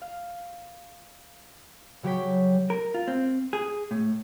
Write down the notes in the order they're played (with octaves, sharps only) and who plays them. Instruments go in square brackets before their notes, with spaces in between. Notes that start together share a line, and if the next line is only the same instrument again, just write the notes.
[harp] F5
C#3 F#3 G4 C#5 G5 B6
[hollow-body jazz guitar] A#4
F4
C4
G#4
A2